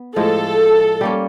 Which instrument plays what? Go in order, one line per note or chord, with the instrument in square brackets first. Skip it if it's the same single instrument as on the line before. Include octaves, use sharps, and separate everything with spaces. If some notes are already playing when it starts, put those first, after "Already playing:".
Already playing: [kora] B3
[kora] A2 F3 G#3 [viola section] A4
[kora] G3 A#3 C#4